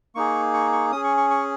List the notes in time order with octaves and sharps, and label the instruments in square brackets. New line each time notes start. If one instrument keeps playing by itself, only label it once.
[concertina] A#3 D#4 G#4 C#6
C#6
C#6
C#4 G#4 D#6
C#6
C#6
C#6